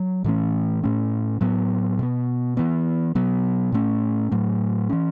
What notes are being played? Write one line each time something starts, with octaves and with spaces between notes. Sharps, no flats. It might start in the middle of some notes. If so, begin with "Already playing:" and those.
Already playing: F#3
A2 E3 A3 C#4
A2 A3 C#4
A2 F#3 B3
B2 B3
E3 B3
B2 F#3 B3
A2 A3 C#4
A2 F#3 A3
E3 C#4